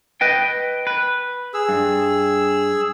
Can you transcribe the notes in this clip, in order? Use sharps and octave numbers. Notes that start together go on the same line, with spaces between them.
B4 D#5 G5
B4
G#4 E6
G2